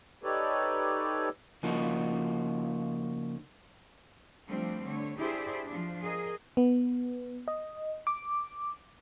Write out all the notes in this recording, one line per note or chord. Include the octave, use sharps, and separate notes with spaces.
D#4 G4 A4 B4 C#5 D5
C#3 F3 A#3 D4 D#4 F#4
F3 G3 A3 C4 D4
D3 A3 C#5
D4 E4 G4 G#4 C5 D5
F3 D4
G#4 A#4 D#5
B3
D#5
D6